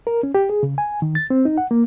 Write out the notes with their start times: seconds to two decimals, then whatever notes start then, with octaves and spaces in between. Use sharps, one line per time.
0.07 A#4
0.23 C#4
0.35 G4
0.50 G#4
0.63 C#3
0.78 G#5
1.02 D#3
1.15 A6
1.30 C4
1.45 D#4
1.58 F#5
1.71 A#3